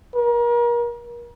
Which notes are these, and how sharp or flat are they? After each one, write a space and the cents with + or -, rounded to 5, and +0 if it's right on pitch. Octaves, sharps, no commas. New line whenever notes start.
A#4 +35